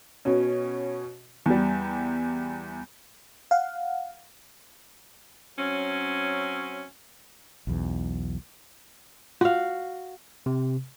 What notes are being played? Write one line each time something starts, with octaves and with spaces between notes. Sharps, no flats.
B2 C#4
E2 G3
F5 F#5
F#3 C4 C#4
B1 E2
F4 F#4 F5
C3